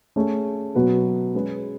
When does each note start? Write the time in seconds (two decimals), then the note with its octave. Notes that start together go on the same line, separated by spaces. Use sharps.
0.16 A3 C#4 G#4 C#5
0.75 B2 F#3 B3 F#4 B4
1.34 G#3 C#4 G#4 B4